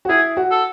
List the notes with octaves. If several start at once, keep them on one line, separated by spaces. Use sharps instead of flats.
F#4
E4 G#4
F#4
A4